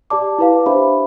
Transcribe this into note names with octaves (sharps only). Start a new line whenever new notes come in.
G4 D5 A5 D6
E4 B4 F5
D4 G4 C5 E5 B5